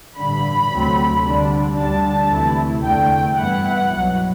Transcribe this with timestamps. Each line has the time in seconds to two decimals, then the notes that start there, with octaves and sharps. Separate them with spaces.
0.17 A1 G2 D3 B5
0.70 D2 C3 F#3 A3 C4
1.24 D2 D3 G3 D4
1.77 D2 D3 G3 D4 A5
2.30 D2 C3 E3 A3 E4
2.83 E2 D3 A3 G5
3.36 G2 E3 B3 E4 F#5
3.89 C2 B2 F#3